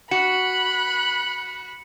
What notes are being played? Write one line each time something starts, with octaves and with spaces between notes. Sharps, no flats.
F#4 B5 F#6 C#7